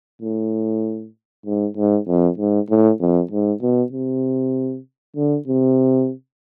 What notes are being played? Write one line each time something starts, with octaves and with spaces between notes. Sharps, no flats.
A2
G#2
G#2
F2
G#2
A2
F2
G#2
B2
C3
D3
C3